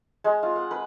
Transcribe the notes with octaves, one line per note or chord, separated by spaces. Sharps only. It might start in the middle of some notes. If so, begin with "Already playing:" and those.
G#3
F4
F#5
B4